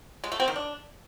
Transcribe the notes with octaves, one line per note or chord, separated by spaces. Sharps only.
G#3
A3
C4
D#3
D4